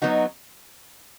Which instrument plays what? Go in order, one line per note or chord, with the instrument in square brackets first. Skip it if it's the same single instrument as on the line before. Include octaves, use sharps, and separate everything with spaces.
[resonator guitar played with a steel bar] F#3 B3 D#4 F#4